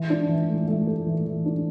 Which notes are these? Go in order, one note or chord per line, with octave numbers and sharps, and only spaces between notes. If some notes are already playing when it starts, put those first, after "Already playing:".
Already playing: E3
D4
E3
A3
A3
A4
E3
E3
D4